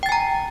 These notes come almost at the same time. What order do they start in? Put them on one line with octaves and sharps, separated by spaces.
G5 A6 G#5 A#5